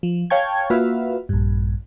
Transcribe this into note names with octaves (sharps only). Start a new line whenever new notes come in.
F3
C#5 F5 G5 A5 C#6 G#6
A#3 F4 F#4 B4 E5 F5
A#1 G2